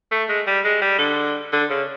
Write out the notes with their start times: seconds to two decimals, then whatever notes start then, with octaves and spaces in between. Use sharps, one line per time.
0.12 A3
0.29 G#3
0.47 G3
0.65 G#3
0.82 G3
0.99 D3
1.52 D3
1.70 C#3